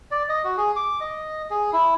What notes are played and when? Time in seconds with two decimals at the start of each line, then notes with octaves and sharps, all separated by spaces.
0.11 D5
0.29 D#5
0.44 F#4
0.57 G#4
0.76 D6
1.01 D#5
1.50 G#4
1.73 E4